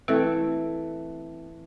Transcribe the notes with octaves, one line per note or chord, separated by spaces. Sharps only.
E3 A3 C4